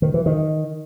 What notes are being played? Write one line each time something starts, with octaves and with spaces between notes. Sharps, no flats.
D#3
E3
D#3